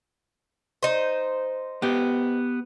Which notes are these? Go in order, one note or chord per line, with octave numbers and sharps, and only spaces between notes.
D#4 C5
B3 G4